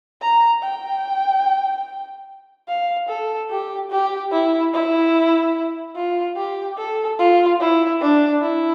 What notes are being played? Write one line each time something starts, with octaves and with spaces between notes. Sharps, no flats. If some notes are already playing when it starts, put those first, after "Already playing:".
A#5
G5
F5
A4
G4
G4
E4
E4
F4
G4
A4
F4
E4
D4
E4